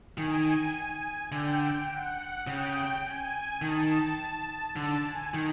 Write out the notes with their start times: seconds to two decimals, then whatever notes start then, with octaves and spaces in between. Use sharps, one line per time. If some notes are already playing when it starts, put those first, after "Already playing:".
0.17 D#3 G#5
1.32 D3 G5
1.90 F#5
2.46 C#3 G5
3.04 G#5
3.62 D#3 A5
4.76 D3 A5
5.05 G#5
5.34 D#3